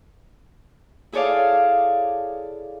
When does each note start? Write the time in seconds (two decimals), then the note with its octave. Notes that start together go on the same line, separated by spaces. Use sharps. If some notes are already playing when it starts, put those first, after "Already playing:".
1.12 E4 G#4 A4 C#5 D5 F5